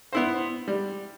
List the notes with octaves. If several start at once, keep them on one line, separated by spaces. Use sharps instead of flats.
B3 E4 C5
G3